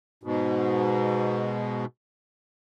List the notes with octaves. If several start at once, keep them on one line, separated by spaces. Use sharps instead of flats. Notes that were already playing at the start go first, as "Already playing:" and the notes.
G#2 B2